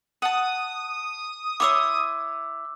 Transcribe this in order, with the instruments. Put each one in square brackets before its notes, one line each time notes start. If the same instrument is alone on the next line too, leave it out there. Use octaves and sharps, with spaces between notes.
[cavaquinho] F#5 A5 [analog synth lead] D#6
[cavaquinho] E4 C#5 C6 [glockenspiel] D6 E6